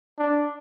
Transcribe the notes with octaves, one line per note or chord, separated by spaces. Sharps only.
D4